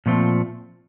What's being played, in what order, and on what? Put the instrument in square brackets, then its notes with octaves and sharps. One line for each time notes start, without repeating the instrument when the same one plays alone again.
[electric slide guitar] A#2 F3 A3 C4